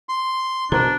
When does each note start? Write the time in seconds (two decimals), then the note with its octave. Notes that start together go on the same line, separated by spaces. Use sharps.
0.09 C6
0.72 B2 D4 A#4 C5 A#5